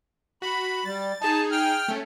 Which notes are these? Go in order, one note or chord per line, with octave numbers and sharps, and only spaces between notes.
F#4 B5
G3 A6
D#4 G#4 A5
G5 F6
A3 C#4